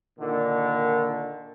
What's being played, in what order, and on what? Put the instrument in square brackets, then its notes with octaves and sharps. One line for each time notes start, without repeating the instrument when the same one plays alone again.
[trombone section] A#2 D3 D#3